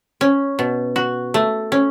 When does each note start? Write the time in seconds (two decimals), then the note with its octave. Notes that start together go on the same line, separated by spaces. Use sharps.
0.21 C#4
0.59 B2
0.96 F#4
1.34 A3
1.72 C#4